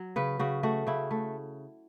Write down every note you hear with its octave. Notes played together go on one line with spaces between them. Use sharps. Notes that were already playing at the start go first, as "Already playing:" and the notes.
Already playing: F#3
C#3 B4
C#3 F#4
A3 F#4
C#3 E4
A3